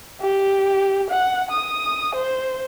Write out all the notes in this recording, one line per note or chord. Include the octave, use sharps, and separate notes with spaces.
G4
F#5
D#6
C5